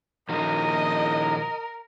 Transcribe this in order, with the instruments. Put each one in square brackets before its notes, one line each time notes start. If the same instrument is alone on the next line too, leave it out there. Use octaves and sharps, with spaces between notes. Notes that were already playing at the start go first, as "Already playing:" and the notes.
[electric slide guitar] A#2 D#3 F3 [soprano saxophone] A#4 [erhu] D#5